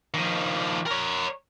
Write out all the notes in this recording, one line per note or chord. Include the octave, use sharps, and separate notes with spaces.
D#3 F3
A#4 C#5